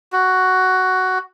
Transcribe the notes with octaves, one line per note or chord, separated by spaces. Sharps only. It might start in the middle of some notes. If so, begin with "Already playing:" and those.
F#4